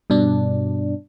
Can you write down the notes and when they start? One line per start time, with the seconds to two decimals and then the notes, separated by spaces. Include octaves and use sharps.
0.10 G2 B2 D4